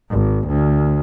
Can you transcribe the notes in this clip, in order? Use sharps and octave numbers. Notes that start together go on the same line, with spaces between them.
G#1
D2